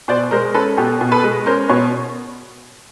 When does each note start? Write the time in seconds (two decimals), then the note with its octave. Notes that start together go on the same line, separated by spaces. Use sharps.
0.08 B2 C5 D5
0.31 G#3 A#4 C5
0.54 C#4 A4 B4
0.77 B2 G4 A4
1.01 B2
1.12 A4 B4
1.24 G#3
1.46 C#4 A#4 C5
1.68 B2 B4 C#5